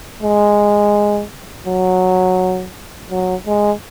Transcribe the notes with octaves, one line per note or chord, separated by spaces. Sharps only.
G#3
F#3
F#3
G#3